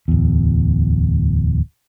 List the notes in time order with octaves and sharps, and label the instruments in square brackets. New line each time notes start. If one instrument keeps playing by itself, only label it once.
[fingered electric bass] D1 E2